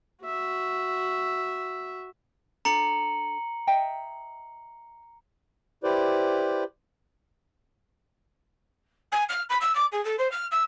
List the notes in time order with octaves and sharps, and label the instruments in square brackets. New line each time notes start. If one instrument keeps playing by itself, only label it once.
[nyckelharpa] F#4 E5
[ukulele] D4 A4 [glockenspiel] A#5 C#7 F#7
[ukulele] D#5 E5 G5
[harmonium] E4 G4 B4 C5 D5
[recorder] G#5
F6
B5
E6
D6
G#4
A4
C5
F6
E6